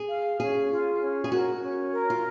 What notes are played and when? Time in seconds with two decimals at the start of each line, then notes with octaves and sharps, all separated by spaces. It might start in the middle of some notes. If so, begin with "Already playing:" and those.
Already playing: G#4
0.09 F5
0.40 C#4 G#4
0.70 F4
1.00 C#4
1.24 G#4
1.31 F#4 A#4
1.62 C#4
1.92 A#4
2.10 F4